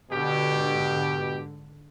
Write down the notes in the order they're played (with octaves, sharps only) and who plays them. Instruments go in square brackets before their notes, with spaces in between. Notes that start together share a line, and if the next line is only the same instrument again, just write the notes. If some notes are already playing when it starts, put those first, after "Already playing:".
[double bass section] G#2 D3 [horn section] B2 G4